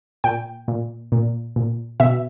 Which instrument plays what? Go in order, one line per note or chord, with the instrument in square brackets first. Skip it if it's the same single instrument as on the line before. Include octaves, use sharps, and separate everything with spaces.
[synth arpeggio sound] A#2 G5
A#2
A#2
A#2
B2 E5